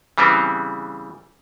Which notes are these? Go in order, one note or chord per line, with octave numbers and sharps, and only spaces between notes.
C#3 E3 G3 B3 C4